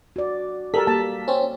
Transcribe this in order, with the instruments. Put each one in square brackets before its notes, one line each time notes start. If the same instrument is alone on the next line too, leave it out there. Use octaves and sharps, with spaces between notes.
[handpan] F#4 D5
[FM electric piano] G3 B6 [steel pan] A4 A#4 A5
[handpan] A#3 [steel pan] A5
[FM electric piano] C4 C#4